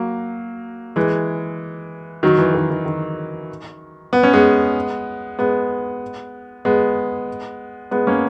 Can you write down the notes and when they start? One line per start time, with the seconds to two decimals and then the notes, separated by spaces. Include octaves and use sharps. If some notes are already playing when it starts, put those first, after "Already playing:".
Already playing: F#3 A#3
0.96 E3 G#3
2.23 D#3 F#3
2.39 E3
2.54 D#3
2.70 D#3
2.86 D#3
4.13 B3
4.23 C#4
4.33 G#3 B3
5.39 G#3 B3
6.65 G#3 B3
7.91 G#3 B3
8.07 A#3 C#4